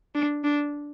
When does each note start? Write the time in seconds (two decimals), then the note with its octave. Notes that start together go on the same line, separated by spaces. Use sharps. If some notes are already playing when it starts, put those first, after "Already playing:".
0.15 D4
0.44 D4